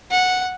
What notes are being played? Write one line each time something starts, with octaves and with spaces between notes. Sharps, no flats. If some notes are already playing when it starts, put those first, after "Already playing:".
F#5